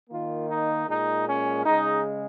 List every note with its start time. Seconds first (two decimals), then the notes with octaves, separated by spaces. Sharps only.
0.10 D#3 A#3 F4
0.49 D#4
0.88 A#2 G#3 D#4
1.27 C#4
1.66 C#3 G#3 D#4